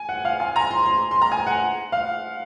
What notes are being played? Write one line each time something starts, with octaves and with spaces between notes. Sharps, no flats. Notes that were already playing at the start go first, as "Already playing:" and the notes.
Already playing: G#5
F#5
F5
G#5
A#5
C6
C6
C6
A#5
G#5
F#5
F5